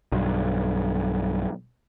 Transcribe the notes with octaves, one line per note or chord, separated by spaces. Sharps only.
B1 G2